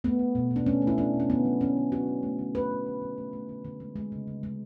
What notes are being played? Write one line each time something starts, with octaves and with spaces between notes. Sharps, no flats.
A3 B3
A3
B2
B2
D4
A3 C#4
A3
E4
B2 D4
B2
C#4
D3 B3
F#3
A3 C#4
D3
D3 F#4
F#3
A3
D3
A3 B4
A3
D3
D3
A3
A3
D3
D3
G#3
G#3
C#3
C#3
G#3